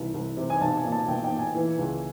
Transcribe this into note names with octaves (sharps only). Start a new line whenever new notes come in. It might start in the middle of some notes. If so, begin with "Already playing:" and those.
Already playing: C2 E3
C2
C3
G#5
B1 A5
G#5
A#2
A5
B1 G5
G5
A#2
G#5
E3
C#2